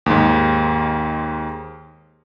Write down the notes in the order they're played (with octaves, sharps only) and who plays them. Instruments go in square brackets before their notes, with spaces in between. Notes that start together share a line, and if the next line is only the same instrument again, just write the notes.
[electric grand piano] D#2 G#2